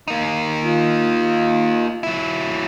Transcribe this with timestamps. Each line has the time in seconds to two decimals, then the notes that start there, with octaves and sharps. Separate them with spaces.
0.08 A#3 D#4
0.63 F4 D#5
2.03 F#3 E4